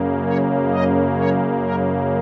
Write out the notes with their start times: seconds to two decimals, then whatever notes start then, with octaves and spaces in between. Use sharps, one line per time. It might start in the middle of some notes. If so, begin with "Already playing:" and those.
Already playing: F#2 C#3 A#3
0.23 C#5
0.70 D#5
1.15 C#5
1.61 A#4